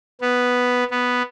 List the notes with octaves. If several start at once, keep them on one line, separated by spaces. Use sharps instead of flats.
B3
B3